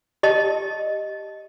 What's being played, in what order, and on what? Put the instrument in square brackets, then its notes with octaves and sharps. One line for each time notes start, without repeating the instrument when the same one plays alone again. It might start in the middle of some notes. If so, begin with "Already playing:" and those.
[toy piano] G4 D#5 A5